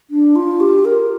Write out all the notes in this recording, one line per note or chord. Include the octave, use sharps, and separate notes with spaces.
D4
F4
G4
A#4